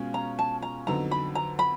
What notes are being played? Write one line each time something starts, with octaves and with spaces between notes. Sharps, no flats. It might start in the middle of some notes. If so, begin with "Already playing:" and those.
Already playing: B2 G#3 C#4 F4
A#5
A5
A#5
F2 D3 F#3 B3 D#4 A#5
B5
A#5
B5